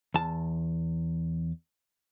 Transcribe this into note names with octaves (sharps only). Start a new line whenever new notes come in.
E2 A5